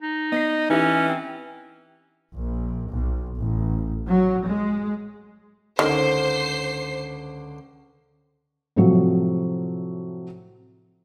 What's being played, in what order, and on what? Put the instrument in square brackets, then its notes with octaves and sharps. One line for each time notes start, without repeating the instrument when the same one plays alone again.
[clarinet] D#4
[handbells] B3 A#6 C7 [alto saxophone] D#5
[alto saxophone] E3 [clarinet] C#4 [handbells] D#4 G4 E5
[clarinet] C4
[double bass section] A#1
B1
A1
F#3
G#3
[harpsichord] C#2 D3 [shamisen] D#3 [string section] C5 C7
[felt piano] A2 C3 F3 F#3